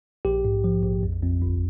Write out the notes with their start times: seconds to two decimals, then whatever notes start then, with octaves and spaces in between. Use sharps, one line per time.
0.25 A#1 G4
0.45 G#2
0.64 F3
0.84 A#1
1.03 F2
1.22 F2
1.42 G1